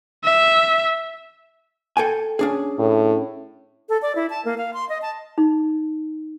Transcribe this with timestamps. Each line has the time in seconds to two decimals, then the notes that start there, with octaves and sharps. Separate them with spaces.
0.25 E5
1.97 A4 G5 G#5
2.39 C#4 D4 G#4
2.79 A2
3.89 A4
4.02 D5
4.15 E4
4.30 A5
4.45 A#3
4.58 F5
4.74 C6
4.89 D#5
5.02 A5
5.38 D#4